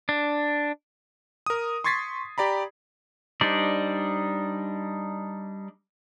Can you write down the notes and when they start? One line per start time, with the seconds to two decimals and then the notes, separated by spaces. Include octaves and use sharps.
0.09 D4
1.46 A#4 D#6
1.84 C6 C#6 G#6 A6 B6 C7
2.38 G4 D5 A#5 B5
3.41 G3 D4 D#4 C5 D5